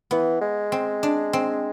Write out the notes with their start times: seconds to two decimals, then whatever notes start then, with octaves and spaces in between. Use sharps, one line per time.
0.11 E3 B3
0.41 G#3
0.72 C4
1.03 D4
1.33 C4